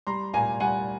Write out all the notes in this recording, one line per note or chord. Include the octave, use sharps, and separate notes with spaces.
G3 A#5 C6
A#2 G#5 A#5
G3 F#5 G#5